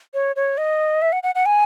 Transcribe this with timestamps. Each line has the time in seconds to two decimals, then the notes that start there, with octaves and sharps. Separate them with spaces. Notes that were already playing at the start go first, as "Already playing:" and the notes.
0.14 C#5
0.36 C#5
0.58 D#5
1.02 E5
1.12 F#5
1.23 F#5
1.35 F#5
1.46 G#5